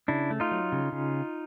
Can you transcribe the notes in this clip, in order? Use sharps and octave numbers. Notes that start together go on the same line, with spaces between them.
C#3 D4 E4
A3
D#4 F4
F#3
C#3
C#3